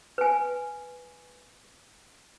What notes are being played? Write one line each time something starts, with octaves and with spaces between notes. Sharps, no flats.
B4 G#5